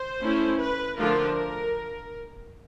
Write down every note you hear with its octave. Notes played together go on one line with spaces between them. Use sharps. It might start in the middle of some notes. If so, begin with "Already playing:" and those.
Already playing: C5
A3 C#4 E4
B4
D3 F3 A3 D4 F4 A#4